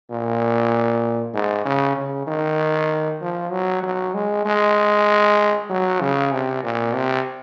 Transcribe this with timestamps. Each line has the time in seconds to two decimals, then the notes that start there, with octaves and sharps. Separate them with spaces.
0.11 A#2
1.34 G#2
1.66 C#3
1.97 C#3
2.27 D#3
3.21 F3
3.52 F#3
3.83 F#3
4.14 G#3
4.46 G#3
5.69 F#3
6.01 C#3
6.32 C3
6.63 A#2
6.95 C3